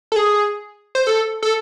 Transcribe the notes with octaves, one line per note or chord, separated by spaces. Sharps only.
A4
G#4
C5
A4
A4